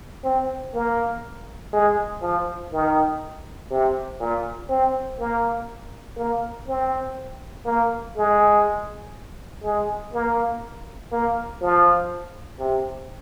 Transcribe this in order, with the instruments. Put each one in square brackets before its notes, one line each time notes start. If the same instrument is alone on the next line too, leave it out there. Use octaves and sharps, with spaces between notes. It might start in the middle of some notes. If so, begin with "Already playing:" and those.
[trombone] C4
A#3
G#3
F3
D#3
C3
A#2
C4
A#3
A#3
C4
A#3
G#3
G#3
A#3
A#3
F3
C3